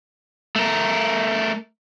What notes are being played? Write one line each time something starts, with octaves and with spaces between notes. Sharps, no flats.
A3 A#4